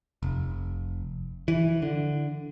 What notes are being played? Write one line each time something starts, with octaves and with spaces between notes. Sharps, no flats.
F1
E3
D3